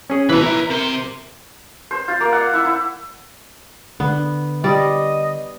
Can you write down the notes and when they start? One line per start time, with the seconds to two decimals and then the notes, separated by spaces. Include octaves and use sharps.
0.10 C#4 G#4
0.30 B2 E3 B4 A#5
0.46 E4
0.70 C3 A#4 C6
1.91 C5
2.08 F4
2.20 A#3
2.33 F#5
2.54 E4
2.65 E4
4.00 D3 B3
4.64 G3 D5 D#5